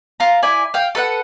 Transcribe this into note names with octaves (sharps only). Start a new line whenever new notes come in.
F4 A#5
E4 D5 G#5
F5 G5
A4 B4 F5 F#5